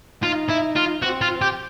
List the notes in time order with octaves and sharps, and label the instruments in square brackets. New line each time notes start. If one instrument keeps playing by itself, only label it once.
[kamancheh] D#4 [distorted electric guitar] F4
[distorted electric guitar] E4
F4
[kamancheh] C4 [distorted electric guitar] F#4
[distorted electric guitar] F4
G4